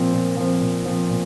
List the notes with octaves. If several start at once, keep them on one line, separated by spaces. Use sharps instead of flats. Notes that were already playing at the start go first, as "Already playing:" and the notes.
Already playing: A#2 F3 C4
A#2
F3 C4
A#2
F3 C4
A#2